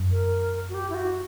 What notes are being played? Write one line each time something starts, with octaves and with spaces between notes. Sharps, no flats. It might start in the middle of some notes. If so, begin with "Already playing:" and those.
Already playing: F#2
A#4
F#4
G4
E4
F#4